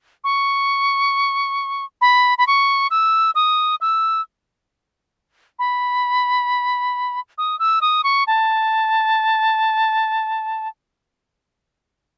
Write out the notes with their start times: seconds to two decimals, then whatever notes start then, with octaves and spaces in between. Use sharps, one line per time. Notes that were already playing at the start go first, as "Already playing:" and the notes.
0.24 C#6
2.01 B5
2.38 B5
2.47 C#6
2.91 E6
3.35 D#6
3.81 E6
5.59 B5
7.38 D#6
7.59 E6
7.81 D#6
8.04 C#6
8.27 A5